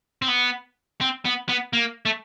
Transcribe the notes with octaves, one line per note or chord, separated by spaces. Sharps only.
C4
B3
C4
B3
B3
A#3
A3